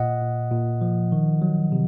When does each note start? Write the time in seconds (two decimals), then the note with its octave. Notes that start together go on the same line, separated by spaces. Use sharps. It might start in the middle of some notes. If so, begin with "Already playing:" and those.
Already playing: A#2 D#5 F#5
0.21 A#2
0.52 A#2
0.81 F3
1.12 D#3
1.42 F#3
1.72 C3